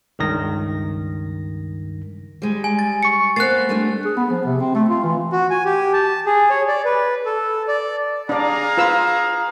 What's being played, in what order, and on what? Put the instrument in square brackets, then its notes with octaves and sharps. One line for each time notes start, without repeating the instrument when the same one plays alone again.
[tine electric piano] C#2 G2 D#3 A#6
[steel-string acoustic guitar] G3 G#3
[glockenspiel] G#5
A6
[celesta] C#6 C#7
[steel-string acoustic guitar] A#3 B3 C5 [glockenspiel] F#6 A6 [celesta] C7
[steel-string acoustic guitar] G3 A3 D4
[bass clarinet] G#4
B3
F3
C3
C4
A3
F4
E3
[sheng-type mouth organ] F#4
G#5
G4
A5
G#4
C#5
D5
B4
A4
D5
[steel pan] D4 D5 [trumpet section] G#4 F5 A#5
[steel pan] F4 B4 E6